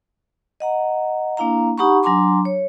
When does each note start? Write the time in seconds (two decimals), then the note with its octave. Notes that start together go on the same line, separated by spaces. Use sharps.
0.60 D#5 F#5 A#5
1.37 A#3 D4 E4 F5 A#5
1.78 D#4 G4 F#5 A#5 B5 C#6
2.03 F#3 D4 G#5 A#5 C6 D6
2.45 C#5